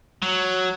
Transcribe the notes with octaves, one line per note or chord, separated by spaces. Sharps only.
F#3